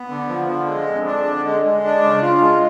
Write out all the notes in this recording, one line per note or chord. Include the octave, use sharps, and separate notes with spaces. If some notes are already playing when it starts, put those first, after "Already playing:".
Already playing: B3
D3
F3
D3
G#3
F2
D4
D3
G#3
G#3
D4
C#3
F4
G#3